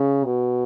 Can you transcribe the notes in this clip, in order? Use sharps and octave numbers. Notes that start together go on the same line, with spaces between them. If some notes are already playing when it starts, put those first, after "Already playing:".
Already playing: C#3
B2